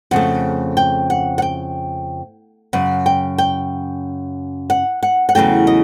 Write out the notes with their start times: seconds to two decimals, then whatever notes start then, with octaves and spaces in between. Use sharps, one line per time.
0.11 F2 C#3 A3 F#5
0.77 G5
1.10 F#5
1.38 F#5
1.42 G5
2.73 F#2 C#3 F#5
3.06 G5
3.38 G5
4.70 F#5
5.03 F#5
5.29 F#5
5.35 E2 C#3 F#3 A3 G5
5.67 D#5